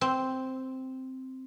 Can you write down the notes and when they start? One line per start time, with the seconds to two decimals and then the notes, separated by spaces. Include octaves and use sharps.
0.01 C4